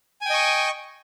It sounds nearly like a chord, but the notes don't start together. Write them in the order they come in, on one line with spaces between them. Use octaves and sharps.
G#5 G5 D#5 C#6